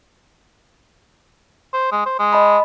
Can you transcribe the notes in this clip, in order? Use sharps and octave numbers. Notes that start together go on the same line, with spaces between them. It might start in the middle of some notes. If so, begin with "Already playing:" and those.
C5
G#3
C5
G#3
D#5 A5 B5